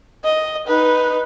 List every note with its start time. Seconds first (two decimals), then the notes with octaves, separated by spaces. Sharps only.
0.24 D#5
0.67 D#4 B4